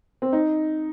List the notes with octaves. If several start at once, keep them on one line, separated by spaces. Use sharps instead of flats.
C4
D#4